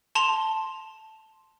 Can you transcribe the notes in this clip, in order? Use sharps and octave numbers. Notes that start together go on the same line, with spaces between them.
A5 C6 E7 F7